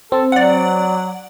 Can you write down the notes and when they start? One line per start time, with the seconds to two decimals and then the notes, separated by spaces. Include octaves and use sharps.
0.12 C4 A4
0.32 F#3 D5 F#5